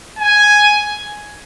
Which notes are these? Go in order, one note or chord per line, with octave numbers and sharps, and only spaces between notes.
G#5